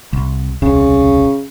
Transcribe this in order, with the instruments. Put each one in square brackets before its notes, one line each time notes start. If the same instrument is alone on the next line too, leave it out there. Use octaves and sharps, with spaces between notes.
[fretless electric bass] C2
[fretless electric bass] D#1 C2 [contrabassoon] C#3